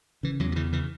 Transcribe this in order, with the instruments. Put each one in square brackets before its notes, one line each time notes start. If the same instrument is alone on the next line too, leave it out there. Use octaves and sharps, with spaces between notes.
[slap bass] C#3 E3
E2 F#3
F#3
C#3 E3
C#3 E3